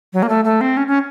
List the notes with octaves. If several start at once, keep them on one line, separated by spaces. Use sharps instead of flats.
F#3
A#3
A3
A3
C4
C#4
C#4